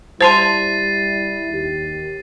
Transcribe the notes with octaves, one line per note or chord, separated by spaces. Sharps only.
G3 E4 C5 A5 C6 A6 C7 D#7
D#2 G4